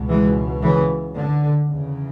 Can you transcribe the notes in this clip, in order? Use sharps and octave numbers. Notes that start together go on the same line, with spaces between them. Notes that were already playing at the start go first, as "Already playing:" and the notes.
Already playing: C#2 B2
E3 G#3
C#3 E3
D3
E2 C#3